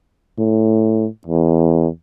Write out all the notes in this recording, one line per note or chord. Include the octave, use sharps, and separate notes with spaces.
A2
E2